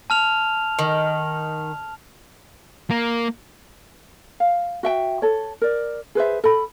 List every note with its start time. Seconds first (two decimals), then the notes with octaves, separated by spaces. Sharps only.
0.10 A5 F6 F7
0.79 D#3
2.91 A#3
4.40 F5
4.83 F#4 E5 G5
5.22 A4 C#5
5.61 A#4 D5
6.15 G#4 B4 C5 E5
6.44 A4 B5